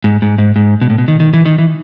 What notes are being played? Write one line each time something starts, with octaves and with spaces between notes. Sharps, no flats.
G#2
G#2
G#2
G#2
B2
A2
B2
D#3
D#3
E3
D#3
E3